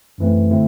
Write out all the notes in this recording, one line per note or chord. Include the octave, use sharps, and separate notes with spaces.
F#2 E3 A3 C4
D3 A3 C4 E4